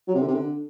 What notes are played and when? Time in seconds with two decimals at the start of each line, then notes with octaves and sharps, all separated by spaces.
0.08 F#3
0.15 C3
0.21 D3
0.28 C3
0.34 D3